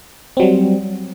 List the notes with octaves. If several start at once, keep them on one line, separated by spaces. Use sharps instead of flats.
F#3 G3 C4